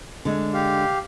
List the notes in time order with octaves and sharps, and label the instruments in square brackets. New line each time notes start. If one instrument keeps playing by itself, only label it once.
[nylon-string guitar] D3 G#3
[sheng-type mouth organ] G4 F5